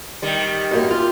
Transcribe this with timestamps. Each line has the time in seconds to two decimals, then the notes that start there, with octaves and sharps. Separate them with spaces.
0.22 D#3 G3
0.71 F#2 A3 A#3
0.91 F4 G4